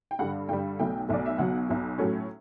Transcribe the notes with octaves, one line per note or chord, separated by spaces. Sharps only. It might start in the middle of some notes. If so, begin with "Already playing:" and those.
G5
G2 D3 G3 F#5
G2 D3 G3 G5
B1 B2 A3 G5
B1 B2 A3 D5
E5
B1 B2 F#3 F#5
B1 B2 F#3
A2 F#3 A3 C#4